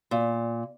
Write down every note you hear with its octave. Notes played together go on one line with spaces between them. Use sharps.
A#2